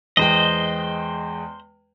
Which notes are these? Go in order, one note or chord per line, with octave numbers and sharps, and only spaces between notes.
E2 G#3 C5 D#5 G5